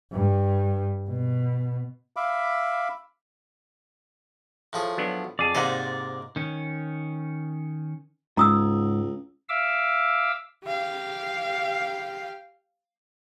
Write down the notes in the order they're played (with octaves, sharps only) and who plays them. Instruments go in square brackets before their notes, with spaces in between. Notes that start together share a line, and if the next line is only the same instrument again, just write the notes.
[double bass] G2
B2
[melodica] E5 F5 B5 D6
[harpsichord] A2 F3 G#4
[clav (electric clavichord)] F#3 B3 D4
[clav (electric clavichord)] F2 G#4 A5 [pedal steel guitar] D5
[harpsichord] G#2 A#3 C5 [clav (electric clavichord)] C3 D#4 F#5
[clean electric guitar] D#3 C#4
[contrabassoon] C#2 [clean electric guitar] G#2 [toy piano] A#5 D#6 E6
[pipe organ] E5 F5 D6 E6
[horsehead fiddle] G4 F5